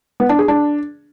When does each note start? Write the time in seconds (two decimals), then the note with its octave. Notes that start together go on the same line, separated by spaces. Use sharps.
0.20 B3
0.29 D4
0.39 G#4
0.48 D4